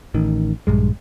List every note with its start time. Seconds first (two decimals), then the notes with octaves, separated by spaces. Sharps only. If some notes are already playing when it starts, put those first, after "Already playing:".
0.14 A1 D#3
0.67 A#1 G2 G#3